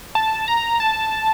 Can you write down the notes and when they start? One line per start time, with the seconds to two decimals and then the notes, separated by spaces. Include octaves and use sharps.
0.15 A5
0.48 A#5
0.80 A5